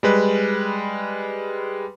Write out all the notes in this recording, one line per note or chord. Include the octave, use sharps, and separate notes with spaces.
G3 G#3 B4